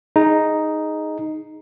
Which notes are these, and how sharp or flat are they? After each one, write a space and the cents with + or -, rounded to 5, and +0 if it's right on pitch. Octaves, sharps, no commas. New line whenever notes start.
D#4 +0 G#4 +0